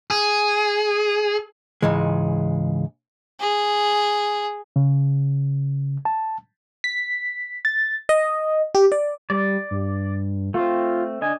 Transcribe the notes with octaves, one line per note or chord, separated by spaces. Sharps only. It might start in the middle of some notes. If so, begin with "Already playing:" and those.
G#4
C#2 G#2 E3 G#3
G#4
C#3
A5
B6
A6
D#5
G4
D5
G3 D5
G2
A3 C4 F4
D3 D4 D#5 G#5